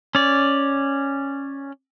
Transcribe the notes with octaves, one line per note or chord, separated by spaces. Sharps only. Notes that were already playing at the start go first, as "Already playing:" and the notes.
C#4 D5